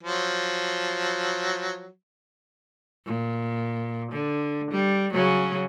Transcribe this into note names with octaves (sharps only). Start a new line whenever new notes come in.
F3 F#3
A#2
D3
G3
C#3 F#3 C#4